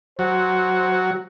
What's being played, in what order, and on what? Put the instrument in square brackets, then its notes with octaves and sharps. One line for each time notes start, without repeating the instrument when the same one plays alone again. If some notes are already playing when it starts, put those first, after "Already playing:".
[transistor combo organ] F#3 [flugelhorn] C5